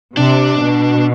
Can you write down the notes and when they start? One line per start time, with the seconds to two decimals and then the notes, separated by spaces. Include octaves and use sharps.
0.16 C3 D4
0.61 B2